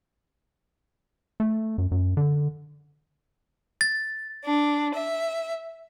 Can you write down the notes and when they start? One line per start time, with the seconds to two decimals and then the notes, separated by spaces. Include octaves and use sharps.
1.40 A3
1.78 F#2
1.91 F#2
2.17 D3
3.81 A6
4.44 D4
4.94 E5